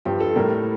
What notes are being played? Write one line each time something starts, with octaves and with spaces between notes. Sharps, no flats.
G2 F3 G4
A4
A2 G3 A#4